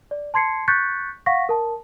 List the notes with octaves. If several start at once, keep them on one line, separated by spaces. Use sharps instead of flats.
D5
A5 C6 G#6 C7 C#7
C#6 F#6 G6 A6 B6 C#7
F5 F#5 C#6 A#6 B6
A#4 A5